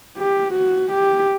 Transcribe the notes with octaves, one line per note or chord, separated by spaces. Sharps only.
G4
F#4
G4